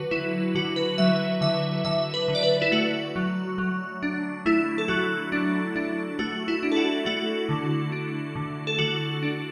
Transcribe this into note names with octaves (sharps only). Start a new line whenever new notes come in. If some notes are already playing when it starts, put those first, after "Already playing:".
Already playing: D3 F#3 F#4 B4
F#3 E4
D3 F#4
B4
F#3 E5
D3 E5
D3 E5
B4
D3
D5
B4
E4
A3 F#4
F#3
F#3
D4
A3 E4
A4
F#3 F#4
D4
D4
A3 F#4
E4
D4
A4
F#4
A3 F#4
D3
D4
D3
A4
D3 F#4
D4